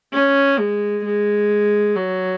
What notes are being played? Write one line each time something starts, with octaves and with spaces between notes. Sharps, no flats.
C#4
G#3
G#3
F#3